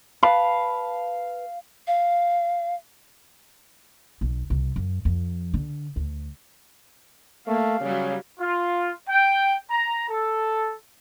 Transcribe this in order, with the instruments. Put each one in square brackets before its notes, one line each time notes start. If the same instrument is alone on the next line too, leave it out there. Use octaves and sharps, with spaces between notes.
[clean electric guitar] B4 A5 B5 [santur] F5
[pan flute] F5
[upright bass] B1
C2
F#2
F2
D3
D2
[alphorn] A3 [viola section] A#3 [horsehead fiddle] F5
[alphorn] C#3 [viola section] F#3 G3
[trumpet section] F4
G5
A#5
A4